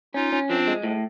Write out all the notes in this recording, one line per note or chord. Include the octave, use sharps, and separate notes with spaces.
C#4 D#4 F4
C#4
F3 C4 D4
G#3
A2